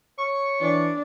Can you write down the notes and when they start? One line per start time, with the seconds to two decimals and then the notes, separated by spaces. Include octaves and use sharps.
0.19 C#5 C#6
0.61 E3 D4